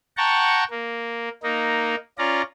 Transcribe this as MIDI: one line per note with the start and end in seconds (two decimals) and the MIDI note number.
0.17 0.64 78
0.17 0.64 79
0.17 0.64 81
0.17 0.64 82
0.17 0.64 85
0.70 1.29 58
1.43 1.95 58
1.43 1.95 63
2.18 2.42 61
2.18 2.42 65
2.18 2.42 74
2.18 2.42 82